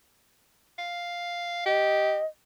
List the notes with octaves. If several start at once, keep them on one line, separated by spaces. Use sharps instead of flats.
F5
G4 D#5